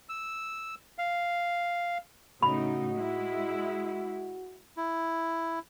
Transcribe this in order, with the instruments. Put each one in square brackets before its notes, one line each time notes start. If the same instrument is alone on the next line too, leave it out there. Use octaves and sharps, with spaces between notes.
[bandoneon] E6
F5
[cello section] A2 C#3 D#4 [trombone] F#4 [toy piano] B5
[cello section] G#3 E4
[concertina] E4